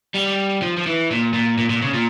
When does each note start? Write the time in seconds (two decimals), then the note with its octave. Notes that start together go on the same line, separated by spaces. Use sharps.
0.14 G3
0.62 F3
0.77 F3
0.87 E3
1.11 A#2
1.34 A#2
1.58 A#2
1.70 A#2
1.82 C#3
1.94 A#2